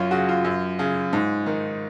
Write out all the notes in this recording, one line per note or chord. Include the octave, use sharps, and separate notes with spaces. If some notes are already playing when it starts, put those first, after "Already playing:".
Already playing: F#2 C#4 F4
C#3 F#4
F4
F#2
C#3
G#2
D#3